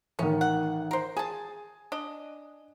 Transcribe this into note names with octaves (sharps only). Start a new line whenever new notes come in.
A1 D#3 B3 C#4
F#5
A#4 C5
G#4 G#5 A5
D4 D#5